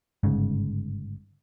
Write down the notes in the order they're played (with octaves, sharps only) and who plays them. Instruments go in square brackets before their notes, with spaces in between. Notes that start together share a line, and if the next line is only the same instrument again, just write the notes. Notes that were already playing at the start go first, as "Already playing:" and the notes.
[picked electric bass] G1 G#2 C#3